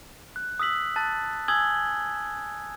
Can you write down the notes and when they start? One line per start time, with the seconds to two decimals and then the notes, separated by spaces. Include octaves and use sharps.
0.36 F#6
0.59 D#6 E6 B6 F#7
0.96 A5 F#6 A6
1.48 G#5 D#6 E6 G#6 F#7 G7